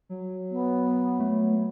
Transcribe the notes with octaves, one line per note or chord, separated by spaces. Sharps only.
F#3
B3
A3